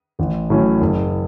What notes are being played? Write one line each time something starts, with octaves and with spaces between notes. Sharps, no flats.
A1
A2 F#3 C#4
F#1